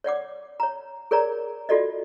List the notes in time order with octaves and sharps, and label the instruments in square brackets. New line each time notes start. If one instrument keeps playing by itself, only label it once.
[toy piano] C#5 D5 F#5 D6
C#5 A#5
G#4 A#4 C#5 D5 A#5
F4 F#4 A4 D5 D#5